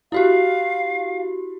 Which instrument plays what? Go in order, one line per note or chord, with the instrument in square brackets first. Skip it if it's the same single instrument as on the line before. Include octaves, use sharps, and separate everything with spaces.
[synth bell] E4 F#4 G4 [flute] F5